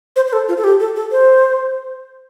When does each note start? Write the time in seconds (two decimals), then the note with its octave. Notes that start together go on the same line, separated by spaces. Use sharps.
0.16 C5
0.27 C5
0.33 A4
0.48 F4
0.57 A4
0.64 G4
0.80 A4
0.96 A4
1.11 C5